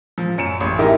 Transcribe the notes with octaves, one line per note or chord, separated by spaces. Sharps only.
F3
F#2 C#7 E7
A1
D#4 E4 G4 A#4